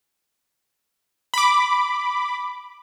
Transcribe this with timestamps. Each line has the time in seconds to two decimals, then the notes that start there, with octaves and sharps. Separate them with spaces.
1.34 B5 D6